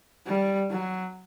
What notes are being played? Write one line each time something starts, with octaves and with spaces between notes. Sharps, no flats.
G3
F#3